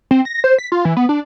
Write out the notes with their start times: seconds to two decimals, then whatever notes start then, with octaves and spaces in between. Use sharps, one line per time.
0.11 C4
0.25 A#6
0.44 C5
0.59 B6
0.72 F4
0.85 E3
0.97 B3
1.09 D4